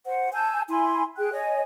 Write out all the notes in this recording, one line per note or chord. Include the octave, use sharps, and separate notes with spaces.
C5 F#5
G#5 A5 E6 G6
E4 G#5 B5 C6
G#4 G5 F#6
C#5 D#5 G#5